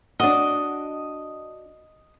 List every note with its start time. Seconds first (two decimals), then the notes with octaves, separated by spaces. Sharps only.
0.20 D4 F#4 D#5